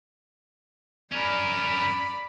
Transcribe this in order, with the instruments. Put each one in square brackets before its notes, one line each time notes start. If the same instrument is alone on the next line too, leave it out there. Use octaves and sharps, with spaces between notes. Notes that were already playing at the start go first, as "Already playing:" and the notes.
[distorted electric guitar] C#4 A#4 [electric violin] D5 B5